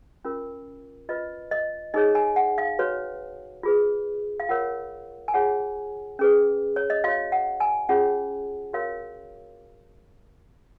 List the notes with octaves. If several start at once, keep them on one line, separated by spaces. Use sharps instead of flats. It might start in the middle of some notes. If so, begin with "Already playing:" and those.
C#4 F4 A#4
F4 B4 D#5
D#5
D#4 G#4 C#5 D#5
G#5
F#5
F5
F#4 B4 C#5
F4 G#4 B4
F5
F4 A#4 C#5 F#5
G#5
F4 G#4 C#5 F#5
C#4 G#4 B4
C#5
D#5
F#4 C#5 F5
F#5
G#5
C#4 F4 G#4 C#5 F#5
F#4 A#4 C#5 F5